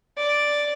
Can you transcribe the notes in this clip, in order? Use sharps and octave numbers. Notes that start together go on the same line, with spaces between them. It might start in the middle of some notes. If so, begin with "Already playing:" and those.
D5